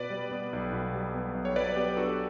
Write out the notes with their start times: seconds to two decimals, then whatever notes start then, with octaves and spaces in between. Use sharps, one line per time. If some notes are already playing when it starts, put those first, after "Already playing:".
Already playing: B2 B4 D5
0.10 G3
0.32 B3
0.53 B1
0.73 B2
0.94 G3
1.15 B3
1.35 B1
1.45 C#5
1.56 F#3 B4 D5
1.76 B3 G4 B4
1.97 D4 F#4 A4